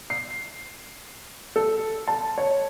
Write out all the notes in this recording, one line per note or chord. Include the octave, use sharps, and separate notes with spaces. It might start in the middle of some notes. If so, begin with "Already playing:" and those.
C7
A4
A5
C#5